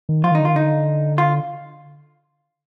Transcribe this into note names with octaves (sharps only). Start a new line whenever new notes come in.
D#3
F3 F4
D#3
D#4
D3
D#3 F4
D3 D#4
F4